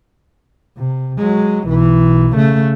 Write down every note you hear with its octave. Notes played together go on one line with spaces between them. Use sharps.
C3
F#3 G#3
B1 E3
C#3 A3